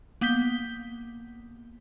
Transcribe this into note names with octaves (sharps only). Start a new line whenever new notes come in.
A#3 B3 G6 B6 G7